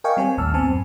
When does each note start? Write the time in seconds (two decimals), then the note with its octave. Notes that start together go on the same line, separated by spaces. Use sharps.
0.04 A#4 D#5 F5 G5 G#5 C#6
0.17 G3 C4 C#5 G#5
0.38 A1 D#2 A2 A5 E6 F6
0.53 A2 B3 C4 G#5 A5
0.69 F#2